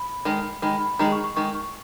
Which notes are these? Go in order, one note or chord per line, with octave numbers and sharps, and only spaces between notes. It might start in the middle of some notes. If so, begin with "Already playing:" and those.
Already playing: B5
D#3 G#3
D#3 G#3 B5
B5
D#3 G#3 A#5
C#6
C#6
D#3 G#3 C#6
C#6